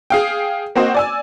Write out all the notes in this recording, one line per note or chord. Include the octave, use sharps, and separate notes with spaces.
G#4 F5 G5
A#3 C4 F#4 C5 D#5
D5 G#5 E6